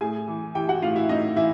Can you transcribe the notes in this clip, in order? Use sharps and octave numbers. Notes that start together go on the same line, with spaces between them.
A2 G#4 G#5
E3
E3 G4 G5
F#4 F#5
A2 F4 F5
E4 E5
A2 D#4 D#5
E3 E4 E5